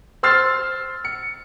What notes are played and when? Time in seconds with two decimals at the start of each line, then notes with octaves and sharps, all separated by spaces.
0.23 C5 C6 E6 F6 A6 C7
1.05 C#7